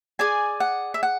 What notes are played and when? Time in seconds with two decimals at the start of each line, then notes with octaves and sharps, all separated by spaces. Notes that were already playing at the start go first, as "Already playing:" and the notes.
0.19 G#4 D5 G#5
0.60 F#5
0.94 E5
1.03 F#5